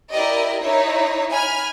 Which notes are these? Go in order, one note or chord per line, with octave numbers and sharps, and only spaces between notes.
E4 G4 A#4 D5 D#5
D#4 E4 C#5
G#5 B5 F6